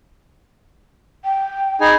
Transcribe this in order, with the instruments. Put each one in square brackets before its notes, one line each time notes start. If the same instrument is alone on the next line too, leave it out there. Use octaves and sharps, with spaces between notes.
[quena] G5
[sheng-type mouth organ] D#4 G#4 G#5 [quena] B5